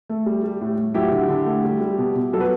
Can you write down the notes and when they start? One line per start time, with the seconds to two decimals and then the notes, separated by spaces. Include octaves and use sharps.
0.09 A3
0.26 G3
0.44 G3
0.61 A2
0.78 A2
0.94 F#3 E4 G4
1.12 D3
1.29 D3
1.46 A3
1.64 G3
1.81 G3
1.98 B2
2.16 B2
2.33 F#3 A4
2.41 B4